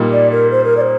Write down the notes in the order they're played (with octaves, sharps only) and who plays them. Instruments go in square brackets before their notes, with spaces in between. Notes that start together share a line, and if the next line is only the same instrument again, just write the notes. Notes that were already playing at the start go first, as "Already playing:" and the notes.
Already playing: [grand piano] A#2 G3 A#3 D#4
[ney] D5
A#4
C5
A#4
D5
C5